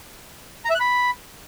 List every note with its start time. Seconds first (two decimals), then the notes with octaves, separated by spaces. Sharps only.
0.65 A#5
0.70 E5
0.75 F#6
0.80 B5